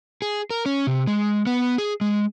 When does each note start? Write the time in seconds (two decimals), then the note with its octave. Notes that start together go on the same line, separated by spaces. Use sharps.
0.22 G#4
0.50 A#4
0.66 C#4
0.87 C3
1.07 G#3
1.47 B3
1.78 G#4
2.01 G#3